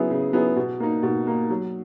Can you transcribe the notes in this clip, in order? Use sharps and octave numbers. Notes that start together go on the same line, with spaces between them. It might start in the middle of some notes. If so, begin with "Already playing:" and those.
Already playing: C#3 F#3 B3 E4 G#4
C#3
F#3 B3 E4 G#4
B2
A#3 D#4
B2
A#3 D#4
F#3